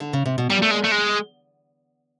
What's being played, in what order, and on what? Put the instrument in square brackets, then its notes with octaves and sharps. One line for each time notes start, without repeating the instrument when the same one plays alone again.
[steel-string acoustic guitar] D3
C#3
C3
B2
[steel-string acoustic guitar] A#2 [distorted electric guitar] G3
[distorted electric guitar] A3
G#3
A3
G#3